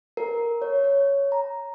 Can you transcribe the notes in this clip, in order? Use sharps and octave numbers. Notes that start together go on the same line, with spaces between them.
A#4
C#5
C#5
A#5